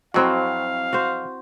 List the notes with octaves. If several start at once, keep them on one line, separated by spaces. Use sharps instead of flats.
F2 F#3 C4 E4 F#4 F5
F#4 C5